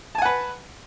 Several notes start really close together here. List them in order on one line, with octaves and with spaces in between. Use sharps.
A5 G#5 F#5 B4